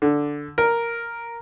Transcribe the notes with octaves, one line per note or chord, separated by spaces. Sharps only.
D3
A#4